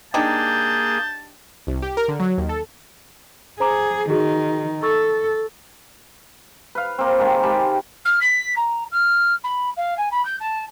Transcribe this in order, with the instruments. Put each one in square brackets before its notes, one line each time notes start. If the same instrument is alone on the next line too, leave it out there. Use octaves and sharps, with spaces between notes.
[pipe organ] A#3 G#4 [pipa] D4 D#4 G4 [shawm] A5 [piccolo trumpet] G6
[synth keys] C2
G4
A#4
D3
F#3
D#2
A4
[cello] G#4 [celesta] C5 A#5 D6
[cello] D#3 [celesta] F#4 G#4
[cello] A4 [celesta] C#6 E6 A6
[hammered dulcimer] B4 F5
A#3 C4
D#3 G#3 A#3
G#3 G4 A5 B5
[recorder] F6
B6
A#5
F6
B5
F5
G#5
B5
G6
A5